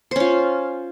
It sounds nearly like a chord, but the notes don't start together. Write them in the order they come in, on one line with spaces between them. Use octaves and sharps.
C5 C#4 F4